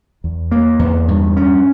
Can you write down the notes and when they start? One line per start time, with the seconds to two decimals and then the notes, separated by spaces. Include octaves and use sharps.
0.24 E2
0.51 A#3
0.79 E2
1.08 G2
1.37 C#4